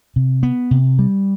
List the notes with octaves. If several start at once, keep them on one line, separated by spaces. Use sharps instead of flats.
C3
B3
C3
G3